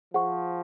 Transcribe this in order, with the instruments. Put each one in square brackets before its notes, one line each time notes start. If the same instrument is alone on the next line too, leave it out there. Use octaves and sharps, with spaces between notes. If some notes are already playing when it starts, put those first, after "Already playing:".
[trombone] F3 [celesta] G#4 C5 F#5 C#6